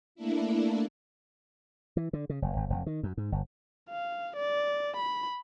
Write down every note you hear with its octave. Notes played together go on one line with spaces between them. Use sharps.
A3 A#3 D4 E4
E3
D3
C#3
F#1
G#1
F1
D#3
F#2
G#2
G1
F5
D5
B5